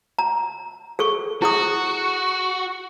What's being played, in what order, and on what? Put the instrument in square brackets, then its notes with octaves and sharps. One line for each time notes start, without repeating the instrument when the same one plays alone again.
[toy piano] A#5
G#4 A4 C#6
[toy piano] E4 G#4 D#6 [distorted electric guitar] F#4